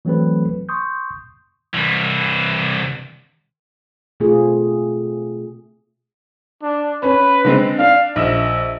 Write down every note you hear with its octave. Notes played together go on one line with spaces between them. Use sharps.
E3 F#3 A3 C4 A4 B4
C6 C#6 D#6 G6
C2 E3
B2 A3 C4 F4 G#4
D4
C#4 B4
D3 G#3 C4
D4 F5
A#1 D#5 E5 E7